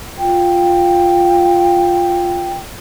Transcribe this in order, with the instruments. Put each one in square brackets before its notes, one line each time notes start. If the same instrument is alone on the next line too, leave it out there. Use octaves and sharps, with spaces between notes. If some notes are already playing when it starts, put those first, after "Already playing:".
[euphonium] F4 [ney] G5